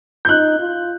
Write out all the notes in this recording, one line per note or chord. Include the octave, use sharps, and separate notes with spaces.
G6
D#4 F#6
F4